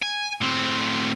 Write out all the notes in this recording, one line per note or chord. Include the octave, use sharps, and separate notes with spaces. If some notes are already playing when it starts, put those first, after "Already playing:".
G#5
A2 C4